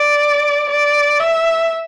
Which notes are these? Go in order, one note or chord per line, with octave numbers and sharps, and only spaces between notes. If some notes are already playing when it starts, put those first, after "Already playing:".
Already playing: D5
D5
E5